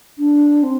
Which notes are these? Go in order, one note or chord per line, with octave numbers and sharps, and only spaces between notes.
D4
C4